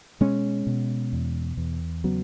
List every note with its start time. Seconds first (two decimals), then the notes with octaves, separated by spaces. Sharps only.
0.21 B2 G#3 C#4
0.67 B2
1.13 E2
1.57 E2
2.04 C#3 F#3 B3